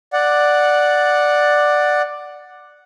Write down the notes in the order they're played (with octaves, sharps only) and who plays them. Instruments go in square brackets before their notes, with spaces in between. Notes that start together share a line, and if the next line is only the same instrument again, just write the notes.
[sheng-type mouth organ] D5 F#5